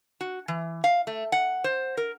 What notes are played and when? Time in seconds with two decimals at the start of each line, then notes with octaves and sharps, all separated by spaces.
0.21 F#4
0.48 E3
0.84 F5
1.07 A3
1.32 F#5
1.64 C5
1.97 A#4